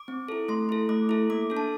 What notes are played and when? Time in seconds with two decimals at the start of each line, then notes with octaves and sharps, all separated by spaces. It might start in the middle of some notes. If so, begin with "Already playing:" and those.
Already playing: D6
0.08 C4
0.28 E4 A4
0.48 A3 C6
0.69 E4 A4
0.89 A3 D6
1.09 E4 A4
1.30 A#3 D6
1.50 D4 A4
1.57 A5